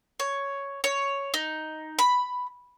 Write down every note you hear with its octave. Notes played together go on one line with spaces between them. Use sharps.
C#5
C#5
D#4
B5